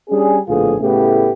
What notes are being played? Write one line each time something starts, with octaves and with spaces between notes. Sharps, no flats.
G3 C#4 D4 G#4
A#1 A2 D3 B3 F4 G#4
A2 C#3 A3 B3 E4 G4